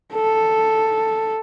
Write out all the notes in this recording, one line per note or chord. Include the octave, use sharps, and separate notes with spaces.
A4